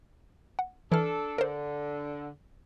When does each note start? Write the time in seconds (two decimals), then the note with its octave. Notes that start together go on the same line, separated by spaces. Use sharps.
0.59 F#5
0.92 E3 D4 A4 F6
1.38 D3 A#4 C5